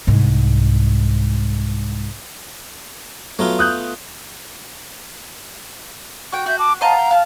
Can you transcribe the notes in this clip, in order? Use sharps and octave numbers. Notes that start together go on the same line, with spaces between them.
C2 G#2
F#3 A3 B3 F4
D#6 F#6 G6
F#4 G5
F#4 E5 G6
A5 D6
C5 D#5 F5 F#5 A5 A#5
G5
F5 A5